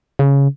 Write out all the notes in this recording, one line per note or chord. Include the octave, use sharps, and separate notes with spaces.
C#3